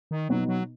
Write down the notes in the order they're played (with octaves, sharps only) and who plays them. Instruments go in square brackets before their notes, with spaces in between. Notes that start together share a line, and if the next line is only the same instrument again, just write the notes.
[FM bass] D#3
[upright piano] B2 B3 D#4 [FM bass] F#3
[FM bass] F#3